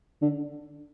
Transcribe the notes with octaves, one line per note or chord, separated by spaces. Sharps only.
D3